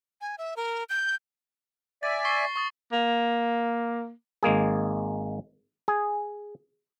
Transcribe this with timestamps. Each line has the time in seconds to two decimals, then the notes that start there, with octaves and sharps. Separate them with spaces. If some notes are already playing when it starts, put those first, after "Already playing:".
0.21 G#5
0.38 E5
0.57 A#4
0.89 G6
2.03 D5 E5 G#5 A6
2.25 C#6 C7 G7
2.56 C#6 D#6 A6
2.92 A#3
4.43 G#1 G#3 A#3 G#4
5.88 G#4